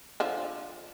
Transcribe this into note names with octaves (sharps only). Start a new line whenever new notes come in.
D3 F3